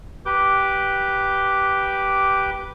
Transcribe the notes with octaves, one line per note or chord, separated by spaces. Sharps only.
G4 B4 D6 G6